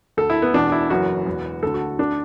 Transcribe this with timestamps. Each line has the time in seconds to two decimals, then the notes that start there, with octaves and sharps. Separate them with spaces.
0.17 D2 D3 A4
0.30 E4
0.42 B3
0.54 E1 E2 B2 D4
0.72 E4
0.90 F#1 F#2 E3 F#4
1.26 E1 E2 E3
1.63 D2 D3 A4
1.74 F#4
1.99 D2 D3 D4